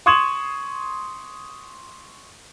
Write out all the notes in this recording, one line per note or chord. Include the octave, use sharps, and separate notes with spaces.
C6 C#6 D#6 G#6 E7 F#7